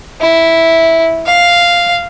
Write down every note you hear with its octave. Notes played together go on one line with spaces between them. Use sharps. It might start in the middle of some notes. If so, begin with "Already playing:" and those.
E4
F5